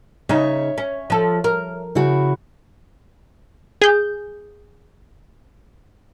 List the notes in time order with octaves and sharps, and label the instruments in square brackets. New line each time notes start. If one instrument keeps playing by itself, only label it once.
[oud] C#3 D#4 [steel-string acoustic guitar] C#5 E5
[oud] C#4
F3 A4
A#4
[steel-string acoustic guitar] C#3 E4 F#4
[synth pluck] G#4 G6